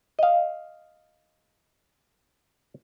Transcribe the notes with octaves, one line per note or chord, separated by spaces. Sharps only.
D#5 F5